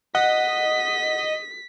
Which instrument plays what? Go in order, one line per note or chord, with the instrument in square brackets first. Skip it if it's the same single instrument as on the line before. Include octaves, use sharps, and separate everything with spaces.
[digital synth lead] D#5 [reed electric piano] F#5 [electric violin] B6